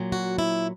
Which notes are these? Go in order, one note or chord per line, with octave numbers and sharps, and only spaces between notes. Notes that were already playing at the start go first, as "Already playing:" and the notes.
Already playing: A#2 F#3
F#4
E4